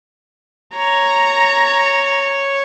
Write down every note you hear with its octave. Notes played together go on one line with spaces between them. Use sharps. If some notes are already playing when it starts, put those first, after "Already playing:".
C#5 A#5